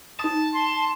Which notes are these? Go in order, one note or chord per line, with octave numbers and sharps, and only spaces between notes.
D#4 A5 D#6
C6